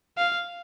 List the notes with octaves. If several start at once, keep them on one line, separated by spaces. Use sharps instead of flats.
F5